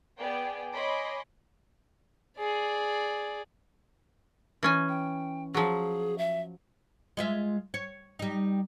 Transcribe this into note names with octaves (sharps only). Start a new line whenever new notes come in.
B3 G#4 D5 G5
C#5 D#5 G#5 B5 C6 D6
G#4 D5
E3 C#4 G#5
G5
F3 F#3 G#4
E5
G#3 F4 E5
C#5
G3 D#4